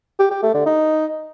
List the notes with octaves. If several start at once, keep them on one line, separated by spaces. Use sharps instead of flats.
G4
G4
A3
D3
D#4